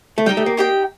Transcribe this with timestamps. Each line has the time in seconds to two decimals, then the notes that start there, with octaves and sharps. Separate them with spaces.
0.18 A3
0.26 G3 D#4 G4 D5 G5
0.37 A3
0.46 A#3
0.57 D#4 G4 D5 G5